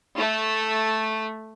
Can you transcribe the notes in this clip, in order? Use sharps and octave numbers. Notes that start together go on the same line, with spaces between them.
A3